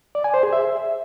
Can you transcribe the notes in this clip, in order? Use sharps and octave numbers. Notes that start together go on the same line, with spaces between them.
D5
G#5
C5
G#4
E5